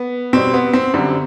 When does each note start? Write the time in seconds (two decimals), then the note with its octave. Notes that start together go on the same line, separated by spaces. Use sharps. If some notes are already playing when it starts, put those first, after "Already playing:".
Already playing: B3
0.33 B2 G3 C4
0.54 B3
0.73 C4
0.94 F#2 D3 G3 C4